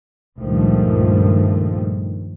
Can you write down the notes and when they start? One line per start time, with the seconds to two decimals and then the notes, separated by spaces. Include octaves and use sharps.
0.39 C#2 G2 A#2 D#3 F3 A3